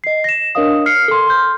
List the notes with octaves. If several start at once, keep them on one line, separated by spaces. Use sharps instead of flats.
D#5 C7
A#6 E7
D4 A#4 C#5 D#5 F5 D#6
F6 C7 C#7
A4 C6
C6 F6 G6